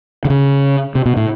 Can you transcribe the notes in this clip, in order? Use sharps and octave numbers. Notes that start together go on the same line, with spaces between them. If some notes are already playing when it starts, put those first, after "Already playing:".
D3
C#3
C3
B2
A2